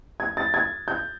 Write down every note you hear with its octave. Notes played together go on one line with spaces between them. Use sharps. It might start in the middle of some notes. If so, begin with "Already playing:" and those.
G#6
A6
G#6
G6